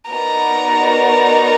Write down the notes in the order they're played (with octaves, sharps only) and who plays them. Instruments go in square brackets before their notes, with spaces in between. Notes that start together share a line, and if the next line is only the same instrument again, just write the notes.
[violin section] B3 D#4 F#4 A#4 D5 [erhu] A#5